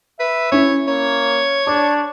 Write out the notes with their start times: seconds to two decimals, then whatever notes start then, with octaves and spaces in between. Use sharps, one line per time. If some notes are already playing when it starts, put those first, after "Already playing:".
0.20 B4 E5
0.52 C#4 E4 C#5
0.88 A#3 C#5
1.67 D4 D6